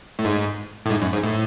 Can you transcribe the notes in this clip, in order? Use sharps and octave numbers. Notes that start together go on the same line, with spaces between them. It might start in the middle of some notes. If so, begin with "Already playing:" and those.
A2
G#2
A2
G#2
F#2
G#2
A2